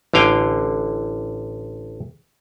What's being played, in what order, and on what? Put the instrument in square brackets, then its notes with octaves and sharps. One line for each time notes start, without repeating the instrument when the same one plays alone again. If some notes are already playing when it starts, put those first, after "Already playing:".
[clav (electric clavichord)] A1 D3 F5 G5 G#5